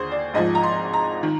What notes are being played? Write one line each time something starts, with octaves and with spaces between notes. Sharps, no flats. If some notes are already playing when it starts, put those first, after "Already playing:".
Already playing: D#2 D3 G#4 C5
D5
G#1 G#2 F3 D#5
A#5
C6
A#5
D#3